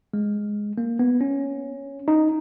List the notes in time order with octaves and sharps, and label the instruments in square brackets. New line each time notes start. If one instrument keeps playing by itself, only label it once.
[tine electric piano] G#3
A#3
B3
C#4
D#4